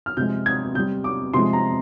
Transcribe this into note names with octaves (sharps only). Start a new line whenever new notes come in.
F6
C3 F3 G#3 G6
G#6
C3 G3 G6
D6
C3 F3 G#3 C6
A#5